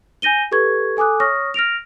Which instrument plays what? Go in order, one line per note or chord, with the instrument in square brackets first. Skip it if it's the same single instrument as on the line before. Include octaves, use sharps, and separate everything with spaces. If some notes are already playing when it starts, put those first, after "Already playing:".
[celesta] G#5 G6 A#6 D#7 G7
G4 A4 B4 C#6 G#6
A4 G#5 D6 D#6 F#6
C#5 C#6 D#6 F6 A#6
F6 A#6 D7 F7